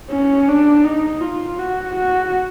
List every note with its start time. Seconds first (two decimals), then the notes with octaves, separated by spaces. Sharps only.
0.11 C#4
0.48 D4
0.85 D#4
1.21 F4
1.58 F#4
1.96 F#4